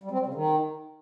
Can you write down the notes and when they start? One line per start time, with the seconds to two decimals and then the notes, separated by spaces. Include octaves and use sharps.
0.03 G3
0.11 C4
0.19 G3
0.26 C#3
0.34 D#3